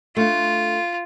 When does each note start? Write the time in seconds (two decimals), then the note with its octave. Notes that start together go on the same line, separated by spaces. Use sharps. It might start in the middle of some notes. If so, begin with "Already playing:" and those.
0.17 A3 D4 F4